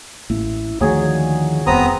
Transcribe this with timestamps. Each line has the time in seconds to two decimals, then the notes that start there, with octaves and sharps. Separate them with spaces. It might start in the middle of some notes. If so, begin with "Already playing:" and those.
0.30 A1 A#3 E4
0.81 D#2 D3 D#3 F3 F#3 A3 A#3 G#4
1.67 D#1 F2 B3 C4 A#5 D#6